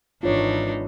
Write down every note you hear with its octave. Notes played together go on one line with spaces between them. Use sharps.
G#1 E3 D4 D#4 F4 C#5